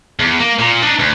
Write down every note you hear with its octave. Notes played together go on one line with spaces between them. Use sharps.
E2
A#3
A#2
D4 D#4
D2